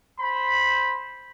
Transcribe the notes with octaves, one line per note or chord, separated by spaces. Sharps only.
C5 B5